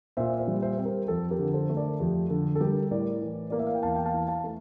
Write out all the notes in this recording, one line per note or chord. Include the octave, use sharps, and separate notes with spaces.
A#2 C5 E5
C5 E5
G3
C5 E5
C4
G4 A#4
F2 A4
G4 A#4
D3
A4 C5
A3
A#4 D5
F2 G4
D3 A4
A4
G3 G4 A#4
A2 A#4 D5
E3
A#3 D5
E5
F5
G5
E2 F5 A5
G5
F5 A5
E3
F5 A5
A3